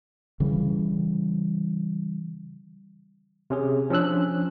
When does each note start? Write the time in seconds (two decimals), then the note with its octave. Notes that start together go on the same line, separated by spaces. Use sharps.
0.40 C#3 E3 G3
3.50 C3 C#4 G#4
3.90 F3 C#4 D4 E6 F#6